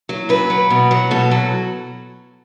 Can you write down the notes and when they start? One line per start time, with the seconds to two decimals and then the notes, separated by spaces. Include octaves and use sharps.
0.09 F#3
0.29 F#2 B4
0.50 F#3
0.70 B2
0.91 F#3
1.11 B2 A4
1.31 F#3